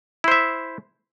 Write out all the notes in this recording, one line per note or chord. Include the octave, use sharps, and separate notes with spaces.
E4 C5 E5